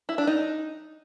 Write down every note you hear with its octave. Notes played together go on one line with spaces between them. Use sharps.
E4
D4
D#4